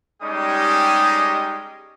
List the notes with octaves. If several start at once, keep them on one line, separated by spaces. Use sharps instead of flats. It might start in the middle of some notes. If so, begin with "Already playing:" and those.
G3 G#3 C#4 D#4 G4 D#6